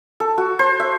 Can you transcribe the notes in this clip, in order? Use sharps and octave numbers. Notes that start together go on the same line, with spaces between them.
A4
F#4
C5
E5